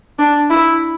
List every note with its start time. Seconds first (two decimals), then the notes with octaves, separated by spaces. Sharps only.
0.19 D4
0.50 E4